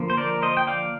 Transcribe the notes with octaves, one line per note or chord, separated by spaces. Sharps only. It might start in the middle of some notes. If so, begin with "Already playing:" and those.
Already playing: D3 F3 A#3
C5
A#4 D5
C5 D#5
G5
D5 F5